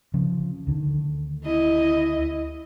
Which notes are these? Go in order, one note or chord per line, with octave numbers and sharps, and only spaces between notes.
C#3 F3 C#4
D2 D3 D#3
E4 D#5